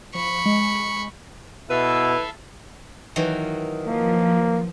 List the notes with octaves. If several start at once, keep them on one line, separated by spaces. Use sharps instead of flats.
F3 B5 C#6
G#3
B2 E4 A4 B4 E5 F5
D#3 E3 F#3
F3 A#3